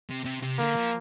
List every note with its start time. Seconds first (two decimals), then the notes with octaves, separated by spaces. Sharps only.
0.10 C3
0.25 C3
0.42 C3
0.58 D3 A#3
0.76 F3